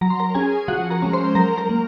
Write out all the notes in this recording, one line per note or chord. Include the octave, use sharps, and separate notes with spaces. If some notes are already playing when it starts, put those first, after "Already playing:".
F#3 A#5
C6
A#4 A#5
C#4 G#4 G#5
F3 F#4 F#5
A#4 A#5
G#3 C#4
C5 C6
F#3 A#4 A#5
A#4 A#5
A#3